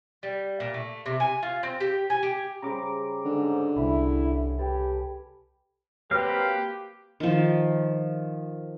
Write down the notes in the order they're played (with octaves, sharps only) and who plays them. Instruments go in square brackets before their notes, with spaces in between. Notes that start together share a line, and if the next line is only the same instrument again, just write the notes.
[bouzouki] G3
A#2
A3
C3
G#5
F4
C4
G4
G#5
G4
[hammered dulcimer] C#3 G3 C5 [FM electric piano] A#5 D6
[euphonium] G#2 [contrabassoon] D3
[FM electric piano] C2 [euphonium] E4 [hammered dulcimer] B5
[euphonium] G4 [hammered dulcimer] A4 B4 G#5
[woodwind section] F#3 C4 B4 [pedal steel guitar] A#3 F5 F6 [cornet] G4
[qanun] D#3 F3